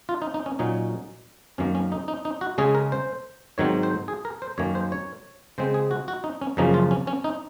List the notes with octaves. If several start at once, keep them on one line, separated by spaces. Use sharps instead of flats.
F4
D#4
D#4
C#4
A#2 F#3 C#4 D#4
F#2 D#3 A#3 C#4
C#4
D#4
D#4
D#4
F#4
C#3 G#3 C#4 G#4
A#4
C5
G#2 D#3 F#3 C4 C#5
C5
G#4
A#4
C5
F#2 D#3 A#3 C#4 C#5
C5
C#5
C#3 G#3 C4 C5
G#4
F#4
F#4
D#4
C#4
F#2 C#3 F3 A#3 C#4 D#4
F4
C#4
C#4
D#4